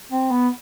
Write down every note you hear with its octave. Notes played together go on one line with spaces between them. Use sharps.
C4
B3